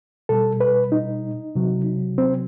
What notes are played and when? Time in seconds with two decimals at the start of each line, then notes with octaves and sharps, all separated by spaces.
0.29 B2 G3 A4
0.60 B4
0.92 D#4
1.55 C3 F#3
2.18 C4